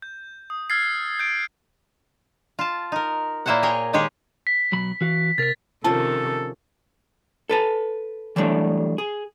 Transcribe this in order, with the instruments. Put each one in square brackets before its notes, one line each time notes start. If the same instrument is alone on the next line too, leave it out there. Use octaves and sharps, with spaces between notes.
[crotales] G6
D#6
E6 F6 G#6 A6 C7
G6 D7
[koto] F4 A5
D#4 A#4
A#2 A#3 E4 C5 C#5 F#5
G#4 A#4 C#5 D#5 G5 G#5
D#3 G#3 G4 G#4 C#5
[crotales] B6
[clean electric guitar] B1 F#3 B5
E3 F#4 F5
[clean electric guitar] C3 A#4 [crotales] A6 B6
[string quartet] C3 D#3 [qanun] F3 C#4 [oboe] A4 [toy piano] A5
[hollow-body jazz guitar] A4 B4 A5
E3 F#3 G3 A3 D4
G#4